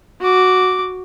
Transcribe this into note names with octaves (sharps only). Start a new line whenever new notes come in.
F#4 D6